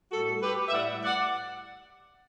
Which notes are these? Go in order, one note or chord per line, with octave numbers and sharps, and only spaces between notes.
A2 G3 F#4 A4
G4 B4
E5
A2 G3 D5 F#5
D5 F#5